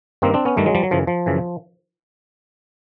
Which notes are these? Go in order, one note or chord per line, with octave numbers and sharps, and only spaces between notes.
G2 D#3 A#3 C4
C4 D4
B3 C#4
G2 D#3 G3 A3
F#3 G#3
F3 G3
F#3
F#2 C#3 E3 F3
F3
F#2 C#3 E3